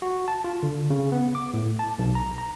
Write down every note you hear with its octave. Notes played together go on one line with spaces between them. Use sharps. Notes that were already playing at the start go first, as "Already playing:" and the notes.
F#4
A5
F4
D3
C#3
B3
D6
A2
A5
B1
A#5
A#5